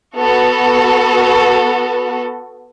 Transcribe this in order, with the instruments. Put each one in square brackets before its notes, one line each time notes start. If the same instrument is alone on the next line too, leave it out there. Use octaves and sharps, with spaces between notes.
[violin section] B3 F#4 A4